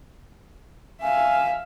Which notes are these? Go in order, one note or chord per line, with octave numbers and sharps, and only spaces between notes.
E5 F5 G#5